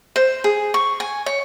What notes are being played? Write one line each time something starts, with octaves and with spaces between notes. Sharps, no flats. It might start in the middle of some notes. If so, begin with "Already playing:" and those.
C5
G#4
C#6
G#5
C#5